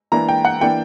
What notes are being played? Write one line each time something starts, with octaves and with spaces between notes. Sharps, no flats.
E3 A#3 D4 A#5
G5
F#5
E3 A#3 D4 G5